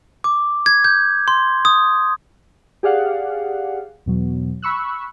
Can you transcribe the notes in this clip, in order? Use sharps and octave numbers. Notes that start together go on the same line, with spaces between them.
D6
G#6
G6
C6
D#6
G4 G#4 D5 F5 F#5
E2 B2 F#3
B5 C#6 E6 F#6